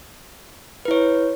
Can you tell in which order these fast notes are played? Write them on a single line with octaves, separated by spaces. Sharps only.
B4 E4 C#5